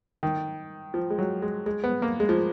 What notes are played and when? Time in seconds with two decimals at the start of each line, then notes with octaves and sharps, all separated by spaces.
0.23 D#3
0.94 F3
1.10 G#3
1.19 F#3
1.42 G#3
1.66 G#3
1.84 B3
2.02 A#3
2.20 G#3
2.29 F3